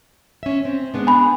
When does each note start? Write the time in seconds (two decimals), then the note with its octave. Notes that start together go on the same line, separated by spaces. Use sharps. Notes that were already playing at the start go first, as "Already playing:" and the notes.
0.43 C#4 E5
0.65 C4
0.94 G#3 B3 D4
1.07 G#5 B5